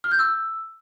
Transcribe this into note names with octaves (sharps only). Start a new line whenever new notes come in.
F6
G6
E6